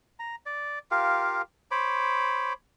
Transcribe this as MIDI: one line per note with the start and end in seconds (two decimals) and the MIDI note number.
0.19 0.35 82
0.46 0.79 74
0.91 1.42 65
0.91 1.42 67
0.91 1.42 70
0.91 1.42 77
1.71 2.53 72
1.71 2.53 73
1.71 2.53 83
1.71 2.53 86